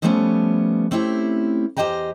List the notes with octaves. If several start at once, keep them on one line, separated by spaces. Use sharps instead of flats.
D3 F3 G3 A3 B3 C#4
A3 C4 C#4 E4 G4
E2 G4 C5 D#5 G5 A#5